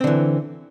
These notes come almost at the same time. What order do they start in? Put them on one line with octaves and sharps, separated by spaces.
C4 D3 E3